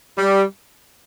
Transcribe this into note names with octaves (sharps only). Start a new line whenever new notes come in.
G3